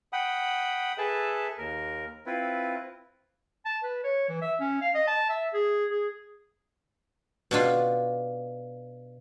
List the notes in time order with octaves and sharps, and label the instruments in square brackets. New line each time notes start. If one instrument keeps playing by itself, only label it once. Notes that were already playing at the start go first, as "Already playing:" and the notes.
[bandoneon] F#5 G5 B5 D#6
G#4 A4 B4 E5 A5
D#2 A#4
C4 E4 F4 B4
[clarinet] A5
B4
C#5
E3
E5
C#4
F5
D#5
A5
E5
G#4
G#4
[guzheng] B2 D4 F4